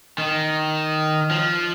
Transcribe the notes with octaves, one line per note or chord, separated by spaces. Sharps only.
D#3
F3